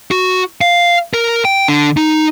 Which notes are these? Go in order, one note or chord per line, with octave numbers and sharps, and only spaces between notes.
F#4
F5
A#4
G5
D3
D#4